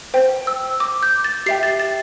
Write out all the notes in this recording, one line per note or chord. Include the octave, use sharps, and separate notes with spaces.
C5 G5
E6
D6
G6
A6
G4 E5 G5 C7
A6
A6